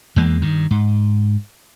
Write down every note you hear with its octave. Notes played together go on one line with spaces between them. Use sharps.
E2 E3 G#3 A#3
G2 D#3
G#2